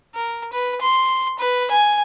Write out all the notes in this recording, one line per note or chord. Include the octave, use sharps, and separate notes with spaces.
A#4
B4
C6
B4
G#5